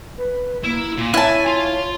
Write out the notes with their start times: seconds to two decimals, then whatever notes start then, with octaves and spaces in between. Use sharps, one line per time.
0.18 B4
0.64 A#3 E4
0.97 A#2
1.14 E4 C#5 G#5 A5
1.47 F4